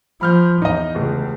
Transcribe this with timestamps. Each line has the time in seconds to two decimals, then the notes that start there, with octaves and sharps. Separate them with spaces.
0.21 F3 B5 F6 G6
0.62 E2 D#4 D#5
0.95 F1 C#2